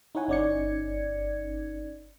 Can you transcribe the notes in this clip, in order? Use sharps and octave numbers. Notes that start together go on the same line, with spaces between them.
D#4 E4 C#5 F#5 G#5
G1 C#4 D#4 D5 G#6 C#7